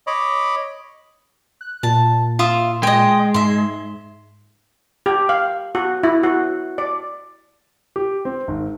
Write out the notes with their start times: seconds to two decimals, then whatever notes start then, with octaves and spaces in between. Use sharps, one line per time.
0.07 C#5 D#5 B5 D6
1.61 F#6
1.83 A#2 A5
2.39 F4 E5 D#6
2.83 G#3 D#5 G5
3.34 G#2 E5 C6
5.06 G4
5.29 F5
5.75 F#4
6.03 E4
6.23 F#4
6.78 D5
7.96 G4
8.25 C4
8.48 G#1